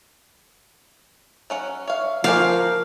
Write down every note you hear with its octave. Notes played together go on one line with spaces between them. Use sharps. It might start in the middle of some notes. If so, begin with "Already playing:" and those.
F#3 C#4 F#5
C#5 E5 F5
F3 F#4 G4 A#4 F5 G#5